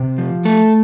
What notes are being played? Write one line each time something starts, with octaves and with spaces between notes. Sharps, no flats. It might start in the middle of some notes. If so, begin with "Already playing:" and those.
Already playing: C3 G4
F3
A3 A4